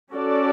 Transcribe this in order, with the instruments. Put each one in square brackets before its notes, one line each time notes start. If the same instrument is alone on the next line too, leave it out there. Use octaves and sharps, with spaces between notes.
[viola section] C#4 F#4 A4 D5